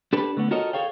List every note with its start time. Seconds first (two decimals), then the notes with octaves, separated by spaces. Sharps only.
0.13 D4 G4 A4 B4
0.37 D3 A3 B3
0.51 F4 F#4 A4 A#4 C#5 D#5
0.73 G#4 A4 C#5 F5 G5